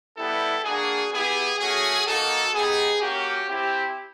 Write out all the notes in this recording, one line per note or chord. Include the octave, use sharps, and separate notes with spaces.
G3 B3 E4 G4 A4
A#3 D4 F#4 G#4
B3 E4 G4 G#4
A3 C#4 F#4 G#4
A#3 D#4 F#4 A4
B3 D#4 G4 G#4
A#3 C#4 F#4 G4
C4 E4 G4